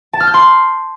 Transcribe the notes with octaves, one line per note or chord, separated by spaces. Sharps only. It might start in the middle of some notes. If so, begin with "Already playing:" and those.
A5
F6
G6
C6